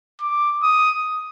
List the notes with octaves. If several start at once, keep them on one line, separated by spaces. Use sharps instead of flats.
D6
D#6